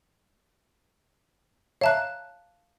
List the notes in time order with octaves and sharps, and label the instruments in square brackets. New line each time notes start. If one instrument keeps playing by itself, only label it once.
[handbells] C#5 E5 A#5 [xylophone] F5 A5 F#6